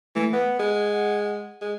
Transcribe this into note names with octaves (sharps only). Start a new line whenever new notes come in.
E3 A3
B3 F#5
G#3
G#3